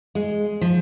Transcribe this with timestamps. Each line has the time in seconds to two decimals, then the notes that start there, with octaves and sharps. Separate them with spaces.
0.15 G#3
0.61 F3